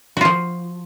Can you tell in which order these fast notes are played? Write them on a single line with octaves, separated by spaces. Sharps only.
F#4 F4 F3